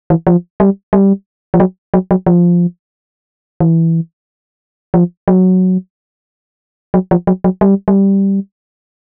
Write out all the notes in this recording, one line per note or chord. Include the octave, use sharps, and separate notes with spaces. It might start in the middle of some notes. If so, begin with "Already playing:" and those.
E3
F3
G3
G3
F3
F#3
F#3
F#3
F3
E3
F3
F#3
F#3
F3
F#3
F#3
G3
G3